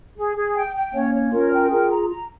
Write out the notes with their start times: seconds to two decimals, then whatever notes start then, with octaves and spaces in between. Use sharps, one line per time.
0.18 G#4
0.37 G#4
0.56 G5
0.75 G5
0.94 A#3 C#4 C#5
1.14 C#5
1.33 C#4 F4 A#4
1.52 G5
1.71 F4 G#4 A#4
1.91 A#5
2.09 A#5